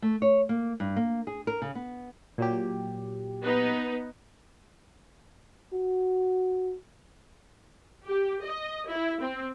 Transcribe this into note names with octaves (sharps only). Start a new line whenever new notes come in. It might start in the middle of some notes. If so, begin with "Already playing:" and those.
A3
C#5
A#3
G2
A#3
G#4
A#4
C#3
B3
A#2 F#3 G4
B3 D#4 B4
F#4
G4
D#5
E4
C4